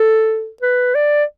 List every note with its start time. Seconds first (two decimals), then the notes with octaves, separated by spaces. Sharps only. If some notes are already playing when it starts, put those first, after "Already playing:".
Already playing: A4
0.62 B4
0.95 D5